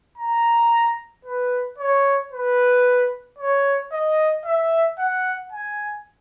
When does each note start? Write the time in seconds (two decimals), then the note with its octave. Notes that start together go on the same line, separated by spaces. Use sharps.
0.18 A#5
1.25 B4
1.79 C#5
2.32 B4
3.38 C#5
3.92 D#5
4.46 E5
4.99 F#5
5.52 G#5